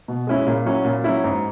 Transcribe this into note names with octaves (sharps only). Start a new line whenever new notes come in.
B2
G#3 C#4 E4
A#2
F#3 C#4 E4
A#2
F#3 C#4 E4
G#2